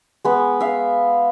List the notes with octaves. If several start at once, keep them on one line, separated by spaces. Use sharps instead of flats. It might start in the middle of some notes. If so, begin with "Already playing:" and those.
G#3 B3 C#6
E5 F5